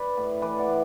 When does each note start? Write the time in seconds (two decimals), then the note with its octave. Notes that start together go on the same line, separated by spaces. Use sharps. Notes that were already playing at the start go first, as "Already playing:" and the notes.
Already playing: B4 D5
0.17 A2
0.41 E3 B4 D5
0.58 D5 F#5
0.68 A2